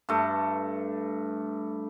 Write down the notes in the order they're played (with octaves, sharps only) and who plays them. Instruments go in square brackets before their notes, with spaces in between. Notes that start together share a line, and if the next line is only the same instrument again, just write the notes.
[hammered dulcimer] G2 A3